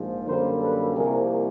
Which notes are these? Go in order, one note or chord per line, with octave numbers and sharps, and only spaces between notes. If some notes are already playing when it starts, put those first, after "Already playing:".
Already playing: A#1 G#2 F3
F#2 D3 G3 A#3 A#4 C5
A4 B4
C2 C3 F3 A#3 G#4 A#4